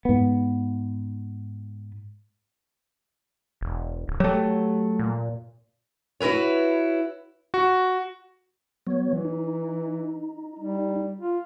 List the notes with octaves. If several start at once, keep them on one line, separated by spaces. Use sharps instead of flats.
G#2 B3
E1
D1
F#3 A3 G4
A#2
E4 F#4 A#4 B4 C#5
F#4
F#3 B3 C#5
E3
D#4
G3
F4